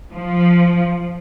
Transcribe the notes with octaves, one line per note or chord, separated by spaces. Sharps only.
F3